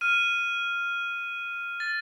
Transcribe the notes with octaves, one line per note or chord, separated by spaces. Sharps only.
F6 D#7
A6